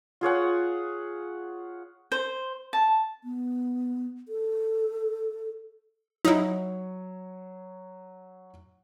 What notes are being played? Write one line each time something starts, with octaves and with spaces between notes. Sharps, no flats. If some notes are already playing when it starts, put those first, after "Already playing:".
F4 G#4 C#5 F#5
C5
A5
B3
A4
F#3 D#4 E4 C#5